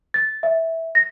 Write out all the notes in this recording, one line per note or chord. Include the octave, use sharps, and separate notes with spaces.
A6
E5
A#6